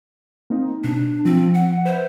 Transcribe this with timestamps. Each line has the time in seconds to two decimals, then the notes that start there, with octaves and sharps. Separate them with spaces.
0.50 A#3 C4 D#4
0.84 B2 D4
1.25 F3 C4
1.54 F#5
1.85 B4 C5 E5